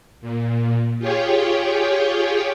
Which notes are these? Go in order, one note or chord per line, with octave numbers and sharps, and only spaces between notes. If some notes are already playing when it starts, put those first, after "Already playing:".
A#2
F4 G4 G#4 C#5 G5